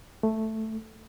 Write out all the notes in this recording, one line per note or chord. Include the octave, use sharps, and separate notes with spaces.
A3